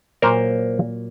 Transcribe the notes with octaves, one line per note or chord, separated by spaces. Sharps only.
A#2 F#3 A#3 A#4 C5